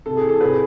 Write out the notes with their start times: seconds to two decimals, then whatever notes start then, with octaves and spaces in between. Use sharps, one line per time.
0.06 C3 A4
0.17 G#4
0.23 E3
0.29 A4
0.40 C3 G#4 B4